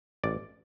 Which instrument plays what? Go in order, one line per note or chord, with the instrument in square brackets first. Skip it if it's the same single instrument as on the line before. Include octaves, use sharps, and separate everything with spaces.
[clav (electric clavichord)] A1 D5